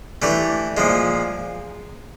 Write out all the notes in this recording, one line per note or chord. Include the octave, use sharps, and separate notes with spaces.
E3 A3 D4 G4
A#2 F3 G#3